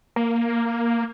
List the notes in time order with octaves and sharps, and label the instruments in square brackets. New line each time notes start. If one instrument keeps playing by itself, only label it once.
[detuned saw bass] A#3